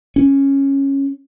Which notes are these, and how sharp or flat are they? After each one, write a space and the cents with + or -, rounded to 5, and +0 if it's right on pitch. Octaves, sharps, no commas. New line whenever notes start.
C#4 -10